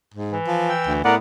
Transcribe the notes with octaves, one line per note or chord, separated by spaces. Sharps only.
G#2
E3
F3
G5 E6
D2
A2 B3 A#4 D5 F#5